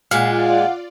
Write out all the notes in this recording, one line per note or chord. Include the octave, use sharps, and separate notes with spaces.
A#2 G#3 F4 D5 F5 F#5